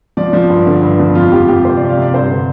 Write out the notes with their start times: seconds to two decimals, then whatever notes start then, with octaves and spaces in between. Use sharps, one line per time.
0.17 F3 D5
0.33 F3
0.49 G2
0.66 D3
0.82 G2
0.99 F3
1.15 F2 F4
1.32 F2 G4
1.48 F2 G4
1.65 C3 C5
1.76 C3 D5
1.89 F5
1.97 C3 D5
2.14 G2 C5
2.30 D3